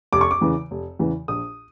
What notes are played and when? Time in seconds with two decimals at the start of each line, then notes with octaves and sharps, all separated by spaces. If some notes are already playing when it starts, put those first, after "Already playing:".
0.12 F1 D6
0.21 C#6
0.31 D6
0.41 E2 C#3 E3
0.71 F1
0.99 E2 C#3 E3
1.28 A#1 D#6